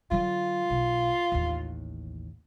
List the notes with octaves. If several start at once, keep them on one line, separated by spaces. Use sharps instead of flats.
D3 F#3 F4
B1
A1 D#2